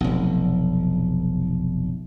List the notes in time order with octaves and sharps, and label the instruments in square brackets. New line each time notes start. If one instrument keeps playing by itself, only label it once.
[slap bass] F1 B1